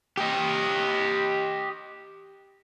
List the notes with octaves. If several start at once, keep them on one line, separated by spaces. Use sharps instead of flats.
G4 D#5